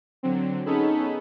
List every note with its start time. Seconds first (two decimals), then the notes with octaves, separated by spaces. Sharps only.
0.23 D3 F#3 C4
0.65 B3 C#4 D#4 G#4 A4 B5